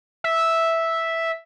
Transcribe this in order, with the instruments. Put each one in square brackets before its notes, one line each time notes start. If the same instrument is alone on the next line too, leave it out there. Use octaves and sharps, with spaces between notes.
[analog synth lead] E5